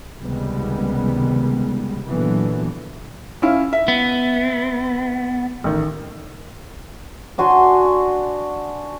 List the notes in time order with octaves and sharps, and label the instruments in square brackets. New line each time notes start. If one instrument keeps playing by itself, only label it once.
[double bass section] C#2 C3 D#3 G3 G#3 B3
A#2 D3 E3 F#3 B3
[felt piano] C#4 E4 F5
E5
[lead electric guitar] B3
[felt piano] A1 D#3
[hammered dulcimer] D4 F#4 G#5 C6